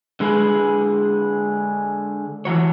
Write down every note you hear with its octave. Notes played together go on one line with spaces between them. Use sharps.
D3 G#3 G#4 B4
E3 F#3 C#5